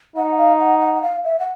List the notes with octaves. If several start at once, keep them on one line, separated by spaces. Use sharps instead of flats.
D#4 F#5
F5
F#5
F#5
F#5
F5
E5
F#5